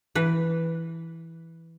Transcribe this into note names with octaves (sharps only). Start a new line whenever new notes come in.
E3 B4